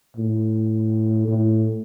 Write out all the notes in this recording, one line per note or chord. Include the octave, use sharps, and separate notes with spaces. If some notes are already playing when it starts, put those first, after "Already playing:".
A2
A2